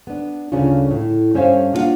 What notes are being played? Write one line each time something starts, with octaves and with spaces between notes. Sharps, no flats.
B3 D4
D2 G2 C#3 C#4 D4 F4
A2
G2 C#4 C5 C#5 E5 F5
A#3 D4 F4 A#4 F5 F#5